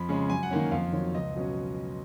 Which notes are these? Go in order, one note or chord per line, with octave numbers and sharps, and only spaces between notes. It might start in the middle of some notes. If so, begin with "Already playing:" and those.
Already playing: F2 B5
C#3 G#3 C#4
F#2 G#5
F#5
D#3 A#3 C#4 G#5
F2 F5
D#3 F#3 C#5
C#2 D#5
B2 F#3 C#4